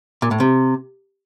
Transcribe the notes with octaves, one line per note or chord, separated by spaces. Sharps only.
A#2
A2
C3